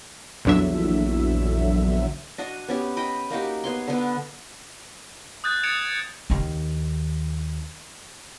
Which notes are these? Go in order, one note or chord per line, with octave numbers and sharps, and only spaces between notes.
A#1 E2 D3 F#3 E5
D4 F#4 D#5
B3 C#4 G4
D#5 G5 B5
A#3 D#4 F#4 G4
B3 C#5 C6
D3 B3
D#6 F#6 G6 A6
G#6 A6 C#7 D7 E7 F7
D#2 D#3